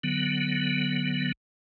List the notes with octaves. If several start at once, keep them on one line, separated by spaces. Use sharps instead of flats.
D3 F#3 B3